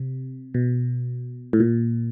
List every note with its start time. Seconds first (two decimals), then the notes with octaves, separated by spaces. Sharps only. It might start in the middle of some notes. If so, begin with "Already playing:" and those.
Already playing: C3
0.54 B2
1.53 A2
1.60 A#2